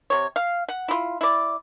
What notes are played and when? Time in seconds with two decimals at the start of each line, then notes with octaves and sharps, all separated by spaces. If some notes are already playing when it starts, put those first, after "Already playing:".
0.10 C3 C#5
0.36 F5
0.69 F#5
0.88 E4 F4
1.21 E4 D5